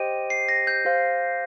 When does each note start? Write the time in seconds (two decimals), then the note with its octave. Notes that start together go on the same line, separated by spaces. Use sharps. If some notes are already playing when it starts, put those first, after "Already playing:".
Already playing: G4 C5 D#5 G5 D#7
0.30 C7
0.49 A#6
0.67 G6
0.85 G4 C5 F5